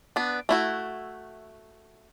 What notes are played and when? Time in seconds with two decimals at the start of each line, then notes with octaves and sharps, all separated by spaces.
0.16 B3 D4
0.49 A3 E4 F#4